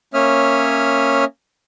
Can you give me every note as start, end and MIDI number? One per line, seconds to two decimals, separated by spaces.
0.14 1.25 58
0.14 1.25 61
0.14 1.25 73
0.14 1.25 76
0.14 1.25 87
0.14 1.25 89